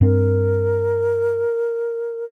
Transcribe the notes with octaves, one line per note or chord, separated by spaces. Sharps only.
G2 C4 A#4